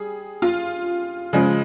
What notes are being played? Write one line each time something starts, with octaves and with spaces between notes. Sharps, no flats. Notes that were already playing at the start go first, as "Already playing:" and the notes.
Already playing: G3 G#4
F4
C#3 F3 G#3